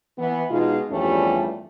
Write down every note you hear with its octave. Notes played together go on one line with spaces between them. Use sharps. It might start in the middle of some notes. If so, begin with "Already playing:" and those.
E3 B3
B2 G#3 D#4 F4
E2 G2 F3 G3 A3 C#4